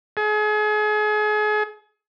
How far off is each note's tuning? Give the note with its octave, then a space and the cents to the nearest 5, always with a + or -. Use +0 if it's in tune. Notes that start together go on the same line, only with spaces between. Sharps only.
G#4 +35